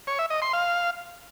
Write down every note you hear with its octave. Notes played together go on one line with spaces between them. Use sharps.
C#5
E5
D#5
C6
F5